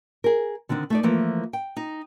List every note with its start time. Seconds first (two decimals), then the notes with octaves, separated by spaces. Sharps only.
0.24 G#4 A#4
0.69 D3 D#3 C4 D4
0.90 A3 D#4 D5
1.03 E3 F3 A3 A#3
1.53 G5
1.77 D#4